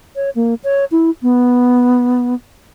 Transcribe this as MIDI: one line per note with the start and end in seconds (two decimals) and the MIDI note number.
0.16 0.30 73
0.35 0.54 58
0.64 0.85 73
0.91 1.10 64
1.22 2.34 59